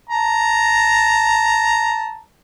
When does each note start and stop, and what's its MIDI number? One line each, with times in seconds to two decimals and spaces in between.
0.09 2.18 81
0.09 2.18 82